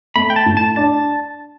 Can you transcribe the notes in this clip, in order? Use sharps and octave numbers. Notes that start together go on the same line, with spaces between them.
A3 B5
G5
A5
A2
A5
D4 A5